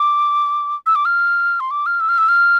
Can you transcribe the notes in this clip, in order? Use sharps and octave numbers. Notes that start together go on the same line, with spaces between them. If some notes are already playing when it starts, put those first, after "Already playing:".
Already playing: D6
E6
D6
F6
C6
D6
F6
E6
F6
E6
F6